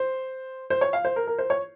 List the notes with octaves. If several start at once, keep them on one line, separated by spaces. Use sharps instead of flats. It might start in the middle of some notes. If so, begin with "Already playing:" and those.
Already playing: C5
C5
C#5
F5
C5
A#4
A#4
C5
C#5